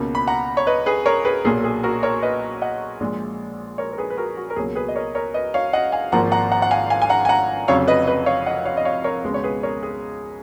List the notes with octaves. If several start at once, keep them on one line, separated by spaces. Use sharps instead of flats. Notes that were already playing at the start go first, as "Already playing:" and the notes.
Already playing: C#2 B2 A#3
B5
F#5 A#5
C#5
B4 D#5
G#4 B4
A#4 C#5
G#4 B4
B1 A#2 F#3 A#3 G#4
G#4
F#4 A#4
A#4 C#5
B4 D#5
D#5 F#5
A#1 A#2 G#3
A#4 C#5
A#4
G#4 B4
B4
F#4 A#4
F#4
A#4
C#2 B2 F#3 A#3 G#4
G#4 B4
D#5
A#4 C#5
A#4 C#5
B4 D#5
C#5 F5
D#5 F#5
F5 G#5
G#1 G#2 F3 A#3 F#5 A#5
F#5 A#5
F#5 A#5
F#5
F5 G#5
F5 G#5
G#5
F#5 A#5
G#5
F#5 A#5
F1 F2 C#3 F#3 C#5 F5
B4 D#5
B4 D#5
C#5 F5
D#5 F#5
C#5 F5
D#5
C#5 F5
A#4 C#5
C#2 B2 G#3 B3
C#5
G#4 B4
A#4 C#5
G#4